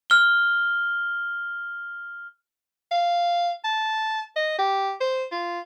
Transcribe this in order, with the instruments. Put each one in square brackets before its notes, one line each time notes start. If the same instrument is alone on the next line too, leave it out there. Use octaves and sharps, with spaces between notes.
[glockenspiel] F6 G7
[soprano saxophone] F5
A5
D#5
G4
C5
F4